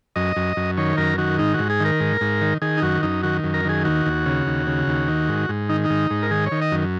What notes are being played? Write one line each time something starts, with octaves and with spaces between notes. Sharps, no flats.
F#2 D#5
F#2
F#2
D#3 C#5
F#2 A#4
D#3 F#4
G#2 D#4
G#2 F#4
G#4
D#3 A#4
G#2
G#2
D#3
D#3 G#4
D#4
F#2 F#4
F#2 D#4
D#3 F#4
F#2
A#4
D#3 G#4
D#2 F#4
D#2
C#3
D#2
C#3
D#2
D#3
G#2
G#2
D#3 D#4
D#4
G#2
G#2
A#4
D#3 G#4
C#5
D#3
D#5
F#2